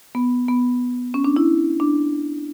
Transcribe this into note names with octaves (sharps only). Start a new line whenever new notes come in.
B3
B3
C#4
D4
E4
D4